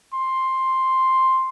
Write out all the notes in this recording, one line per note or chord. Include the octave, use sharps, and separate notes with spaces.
C6